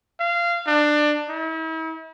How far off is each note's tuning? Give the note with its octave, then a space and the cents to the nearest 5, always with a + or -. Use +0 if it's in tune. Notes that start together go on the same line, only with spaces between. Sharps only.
F5 -20
D4 +20
E4 -40